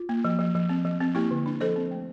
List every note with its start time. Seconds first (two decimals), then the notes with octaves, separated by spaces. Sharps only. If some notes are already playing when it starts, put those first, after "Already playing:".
Already playing: F4
0.09 A#3
0.25 F3
0.39 F3
0.55 F3
0.69 C4
0.85 F3
1.00 C4
1.15 A#3 E4 G4
1.31 D3
1.46 D4
1.61 F3 A4 C5
1.76 C4
1.91 A3